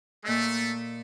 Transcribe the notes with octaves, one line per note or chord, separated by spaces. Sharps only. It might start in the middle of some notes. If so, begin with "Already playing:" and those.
A#2 A3 D#5 E6